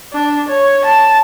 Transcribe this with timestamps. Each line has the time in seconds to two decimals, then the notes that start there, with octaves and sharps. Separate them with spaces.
0.13 D4
0.49 C#5
0.85 A5